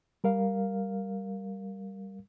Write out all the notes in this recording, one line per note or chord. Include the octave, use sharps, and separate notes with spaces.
G3 A#4 F5